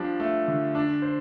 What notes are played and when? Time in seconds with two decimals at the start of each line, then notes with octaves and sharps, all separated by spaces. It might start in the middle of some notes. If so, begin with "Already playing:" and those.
Already playing: F3 G3 D4
0.20 A3
0.48 D3
0.75 D4
1.02 C5